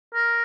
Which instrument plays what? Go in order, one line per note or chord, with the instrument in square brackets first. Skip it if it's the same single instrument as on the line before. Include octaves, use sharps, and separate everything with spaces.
[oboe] A#4